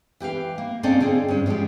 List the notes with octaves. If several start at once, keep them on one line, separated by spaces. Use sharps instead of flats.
E3 G4 B4 F5
A#3
A#3 C4 C#4 A4 D5 D#5
D3 C4 F4 G#4
G2 C#4 D4
F3 G#3 C#4 G4